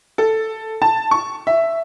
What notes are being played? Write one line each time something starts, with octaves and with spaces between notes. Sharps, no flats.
A4
A5
C#6
E5